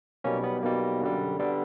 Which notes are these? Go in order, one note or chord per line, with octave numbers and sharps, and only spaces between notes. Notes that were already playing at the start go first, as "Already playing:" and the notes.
B1 B2 G3 A#3 C#4
B3
B1 B2 G3 A#3
F#2 D3 G3
D3 G3 B3